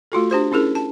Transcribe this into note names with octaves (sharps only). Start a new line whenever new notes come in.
A3 F4 F#4 A4
D4 G4 C5 C6
C#4 E4 G#4 A#4
A5